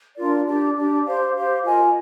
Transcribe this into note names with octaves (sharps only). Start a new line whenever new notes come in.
D4 F4 A#4 D5
D4 G4 D5
D4 G4 D5
G4 C5 F5
G4 C5 F5
F4 A#4 D#5 G#5